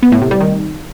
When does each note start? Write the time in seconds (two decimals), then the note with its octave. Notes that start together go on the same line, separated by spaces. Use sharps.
0.03 B3
0.12 A2
0.22 C3
0.31 G3
0.41 D#3